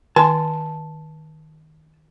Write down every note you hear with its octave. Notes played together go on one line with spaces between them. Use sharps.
D#3 G#5 A5 C6